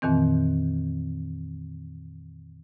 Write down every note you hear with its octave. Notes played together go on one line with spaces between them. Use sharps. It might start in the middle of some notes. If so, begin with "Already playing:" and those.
F2 A#2 D#3 E3 C4